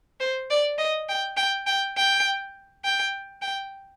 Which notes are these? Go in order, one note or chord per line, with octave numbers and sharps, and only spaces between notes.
C5
D5
D#5
G5
G5
G5
G5
G5
G5